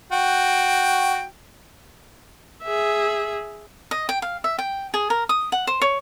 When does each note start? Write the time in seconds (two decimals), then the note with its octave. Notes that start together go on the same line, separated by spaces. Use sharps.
0.12 F#4 G5
2.63 G#4 E5
3.91 D#5
4.09 G5
4.22 F5
4.44 E5
4.58 G5
4.94 G#4
5.10 A#4
5.29 D#6
5.52 F#5
5.67 C5
5.82 C#5